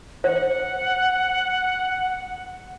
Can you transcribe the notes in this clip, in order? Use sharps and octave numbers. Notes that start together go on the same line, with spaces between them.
C5 F#5